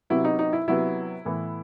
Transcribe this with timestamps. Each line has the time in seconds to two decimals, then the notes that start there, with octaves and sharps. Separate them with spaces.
0.10 C3 F#3 B3 E4
0.25 D#4
0.39 D#4
0.53 E4
0.68 C3 F#3 B3 E4
1.25 A2 E3 B3